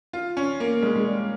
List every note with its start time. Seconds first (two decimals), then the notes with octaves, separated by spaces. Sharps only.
0.13 F4
0.37 C#4
0.60 A#3
0.83 G#3
0.95 G#3
1.06 G3